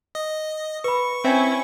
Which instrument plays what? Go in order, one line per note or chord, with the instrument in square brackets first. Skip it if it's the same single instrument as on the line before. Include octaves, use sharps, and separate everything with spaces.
[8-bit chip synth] D#5
[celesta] B4 B5 [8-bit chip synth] C#6
[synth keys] C4 C5 E5 [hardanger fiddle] C#4 E4